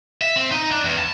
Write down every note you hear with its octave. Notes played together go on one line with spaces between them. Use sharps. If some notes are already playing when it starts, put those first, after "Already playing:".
E5
C4
D#4
D4
E2
A5